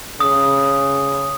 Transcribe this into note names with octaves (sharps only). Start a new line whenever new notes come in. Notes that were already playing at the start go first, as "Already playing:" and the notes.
C#3 D#6